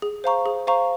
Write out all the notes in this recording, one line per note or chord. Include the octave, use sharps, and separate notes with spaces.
G#4
C5 F5 A#5 C#6
G#4
C5 F5 A#5 C#6